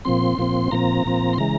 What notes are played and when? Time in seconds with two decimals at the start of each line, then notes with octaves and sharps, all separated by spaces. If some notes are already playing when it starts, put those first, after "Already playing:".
0.05 A#2 F3 C4 C6
0.39 A#2 F3 C4
0.71 A#2 F3 C4 A#5
1.05 A#2 F3 C4
1.33 C6
1.38 C#3 E3 G#3 A#5